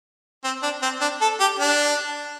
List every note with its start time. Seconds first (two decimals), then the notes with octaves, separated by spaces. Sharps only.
0.44 C4
0.63 D4
0.82 C4
1.01 D4
1.21 A4
1.40 G4
1.59 D4